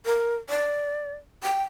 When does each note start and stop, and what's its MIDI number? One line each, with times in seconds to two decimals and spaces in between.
0.06 0.35 70
0.50 1.14 74
1.43 1.63 79